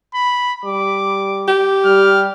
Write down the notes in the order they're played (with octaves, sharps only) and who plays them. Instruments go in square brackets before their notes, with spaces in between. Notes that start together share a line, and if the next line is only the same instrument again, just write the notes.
[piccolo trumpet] B5
[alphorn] G3 [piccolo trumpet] D6
[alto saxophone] G4
[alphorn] G3 [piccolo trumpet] F6